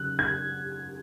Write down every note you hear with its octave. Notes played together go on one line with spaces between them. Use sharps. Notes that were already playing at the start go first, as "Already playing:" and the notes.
Already playing: C#3 F#3 E6 F#6
G#6